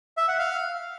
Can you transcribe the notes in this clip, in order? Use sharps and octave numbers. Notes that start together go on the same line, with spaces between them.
E5
F#5
F5